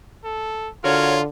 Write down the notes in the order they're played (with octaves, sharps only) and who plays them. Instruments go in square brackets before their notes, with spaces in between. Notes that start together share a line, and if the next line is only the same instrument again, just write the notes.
[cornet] A4
[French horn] D3 [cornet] F4 [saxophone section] F#4 A#4 C#5